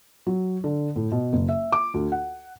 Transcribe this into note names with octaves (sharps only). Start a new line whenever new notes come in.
F#3
D3
A2
B2
F#1
E5
D6
D2
F#5